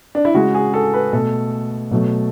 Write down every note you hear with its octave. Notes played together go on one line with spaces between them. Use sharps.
D4
E4
C#3 G#3 F#4
G#4
A4
B4
B2 A3 A4
B2 F#3 A3